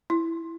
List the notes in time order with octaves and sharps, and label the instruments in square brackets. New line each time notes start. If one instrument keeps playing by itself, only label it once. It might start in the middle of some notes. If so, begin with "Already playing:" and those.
[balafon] E4